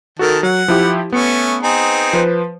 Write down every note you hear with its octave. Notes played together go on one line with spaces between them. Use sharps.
D#3 F#4 A4 A#4 A5
F#3 F#5
F3 E4 G4
A3 B3 C#4 C#7
C4 D#4 G#4
F3 B4 C5